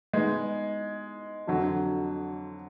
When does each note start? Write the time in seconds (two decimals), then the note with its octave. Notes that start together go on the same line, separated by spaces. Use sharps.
0.13 G#3 B3 D#4
1.47 F2 D3 F#3